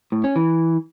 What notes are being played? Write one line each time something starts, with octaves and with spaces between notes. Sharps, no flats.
A2
C#4
E3